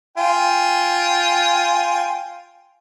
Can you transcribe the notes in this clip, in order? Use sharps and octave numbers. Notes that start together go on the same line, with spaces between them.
F4 G5 G#5